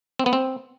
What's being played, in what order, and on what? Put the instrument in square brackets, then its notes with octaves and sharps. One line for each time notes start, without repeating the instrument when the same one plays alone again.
[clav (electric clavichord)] C4
B3
C4